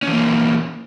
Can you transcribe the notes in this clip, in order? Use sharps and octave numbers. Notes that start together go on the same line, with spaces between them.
E3 A#3 C#4